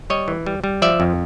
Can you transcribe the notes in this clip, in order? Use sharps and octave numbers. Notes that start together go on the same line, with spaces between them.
G3 C#5 D#5
E3
G3
G3
F3 D5 E5
F2